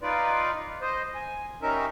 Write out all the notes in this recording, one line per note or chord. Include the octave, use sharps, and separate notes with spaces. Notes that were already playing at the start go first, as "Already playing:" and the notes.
D#4 F4 B4 D5
C5 D#5
G#5
G3 C#4 D#4 A#4 E5